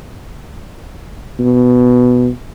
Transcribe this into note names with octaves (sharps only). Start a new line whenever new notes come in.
B2